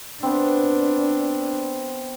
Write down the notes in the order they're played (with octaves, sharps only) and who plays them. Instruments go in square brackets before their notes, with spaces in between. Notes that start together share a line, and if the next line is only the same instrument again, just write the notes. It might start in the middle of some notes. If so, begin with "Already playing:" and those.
[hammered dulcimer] B3 C4 [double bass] D4